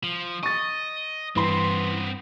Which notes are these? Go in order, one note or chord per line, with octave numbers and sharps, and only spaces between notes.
F3
D#5 C#6 A6
G2 E3 B3 C4 C6